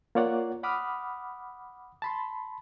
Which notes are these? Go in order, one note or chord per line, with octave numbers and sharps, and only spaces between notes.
A#3 F4 C#5 D5 F#5
F#5 B5 D6 D#6 F6
A5 B5 C6